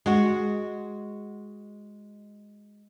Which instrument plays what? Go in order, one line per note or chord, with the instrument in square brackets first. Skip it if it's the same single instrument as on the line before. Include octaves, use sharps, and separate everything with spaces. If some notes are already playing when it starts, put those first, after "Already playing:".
[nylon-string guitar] G#3 F#4